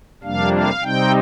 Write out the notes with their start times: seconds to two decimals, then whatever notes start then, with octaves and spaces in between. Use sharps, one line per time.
0.23 F2 C3 G3 A#3 D4 F5
0.53 F5
0.82 C3 G3 C4 D#4 G5